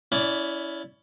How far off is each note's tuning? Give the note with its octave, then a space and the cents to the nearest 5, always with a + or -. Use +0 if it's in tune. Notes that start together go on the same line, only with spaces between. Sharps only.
C#4 +25 E4 +0 D5 +0